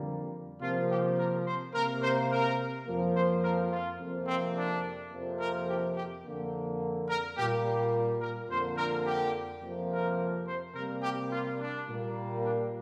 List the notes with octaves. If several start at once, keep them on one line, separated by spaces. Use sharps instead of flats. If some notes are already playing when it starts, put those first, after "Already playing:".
Already playing: F2 D3 G3 A#3
C3 F3 A#3 F4
G4
A#4
C5
C3 A#3 A#4
C5
A#4
F2 F3 A#3
C5
A#4
F4
F2 C3 F3 A#3
C4
D4
F2 C3 F3 A#3
A#4
G4
G4
F2 D3 A#3
A#4
A#2 G3 A#3 G4
G4
A#4
F2 D3 A#3 C5
A#4
G4
F2 C3 F3 A#3
A#4
C5
C3 G3 A#3 A#4
G4
F4
D4
A#2 G3 A#3
D4